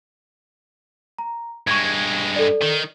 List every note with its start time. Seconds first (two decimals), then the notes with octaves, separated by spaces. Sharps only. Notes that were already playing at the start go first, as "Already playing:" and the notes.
1.19 A#5
1.67 G2 G#3 C#6 G#6
2.36 A4 D5
2.62 D#3